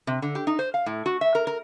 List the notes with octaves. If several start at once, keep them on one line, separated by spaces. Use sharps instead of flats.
C3
D3
G4
D#4
C5
F5
A2
F#4
E5
A#4
A#4